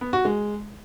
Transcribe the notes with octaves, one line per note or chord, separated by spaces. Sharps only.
B3
F#4
G#3